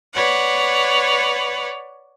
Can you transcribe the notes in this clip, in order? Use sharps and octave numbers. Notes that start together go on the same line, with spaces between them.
B4 C#5 D5 F#5